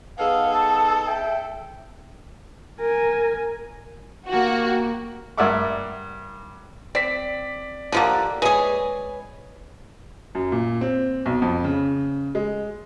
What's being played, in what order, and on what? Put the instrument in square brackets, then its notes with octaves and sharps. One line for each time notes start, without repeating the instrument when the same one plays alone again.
[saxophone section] B3 D#4 G#4 [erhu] A4 [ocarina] B4 [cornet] F5
[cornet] A5 [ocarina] E6
[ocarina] E5 [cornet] G5
[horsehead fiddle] A#4 G#5
[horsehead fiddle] A#3 G4 [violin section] F#4
[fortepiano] G2 A#4 D5 E5 F#5 D6
[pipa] C4 [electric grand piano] D5 B6
[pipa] D3 F3 A#3 [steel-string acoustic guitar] G4 F#5
[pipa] G#3 G#4 [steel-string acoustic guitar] B4 C#5
[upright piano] F#2
A#2
C4
B1
F2
C#3
G#3